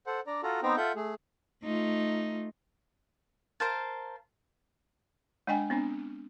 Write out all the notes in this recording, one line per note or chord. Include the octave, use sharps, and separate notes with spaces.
A4 C5 F#5
D4 D5 A#5
F4 F#4 A4 A#5
B3 C4 D#4 C5 G5 A#5
F4 A4 E5 F#5 G6
A3 G#4
A3 D#4 F4
A#4 C5 F5 A5
G#3 D4 D#5 G5 G#5
B3 C4 D4